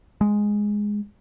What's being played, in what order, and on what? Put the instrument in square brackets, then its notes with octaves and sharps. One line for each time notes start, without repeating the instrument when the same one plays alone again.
[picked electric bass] G#3